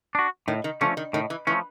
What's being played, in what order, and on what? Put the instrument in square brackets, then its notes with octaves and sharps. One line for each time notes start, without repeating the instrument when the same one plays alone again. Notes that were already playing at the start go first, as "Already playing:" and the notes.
[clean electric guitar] D4 F#4
[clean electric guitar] A2 [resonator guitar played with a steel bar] D#3
[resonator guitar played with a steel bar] D#3
[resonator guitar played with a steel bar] D3 [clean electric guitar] F3 A3 C#4
[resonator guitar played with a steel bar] D#3
[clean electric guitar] A2 [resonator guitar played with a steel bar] D#3
[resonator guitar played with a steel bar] E3
[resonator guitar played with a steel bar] E3 [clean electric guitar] F3 A3 C#4